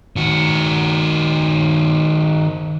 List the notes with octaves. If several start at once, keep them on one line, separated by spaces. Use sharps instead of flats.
D#3 F#4